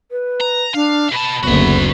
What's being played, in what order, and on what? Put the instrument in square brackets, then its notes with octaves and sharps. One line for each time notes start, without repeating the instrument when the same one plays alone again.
[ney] B4
[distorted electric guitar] A#5
[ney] D4 [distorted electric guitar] F5
[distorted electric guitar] B2 A5 [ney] B5
[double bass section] F#1 D2 B3 [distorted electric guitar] F#4 E5